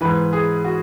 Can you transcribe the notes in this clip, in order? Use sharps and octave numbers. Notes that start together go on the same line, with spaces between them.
G#2 E3 B4
G#4
F#4